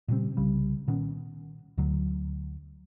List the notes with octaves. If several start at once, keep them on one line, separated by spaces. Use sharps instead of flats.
A#2 C#3 G3 C4
C2 C#3 G3
A#2 D#3 B3 C#4
D2 D3 F#3